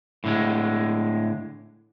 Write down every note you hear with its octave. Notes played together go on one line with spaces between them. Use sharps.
A2 D3 G#3